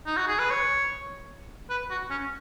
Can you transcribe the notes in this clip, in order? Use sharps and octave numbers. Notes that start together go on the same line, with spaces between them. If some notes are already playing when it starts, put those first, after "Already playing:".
D#4
F#4
G#4
B4
C#5
B4
F#4
C#4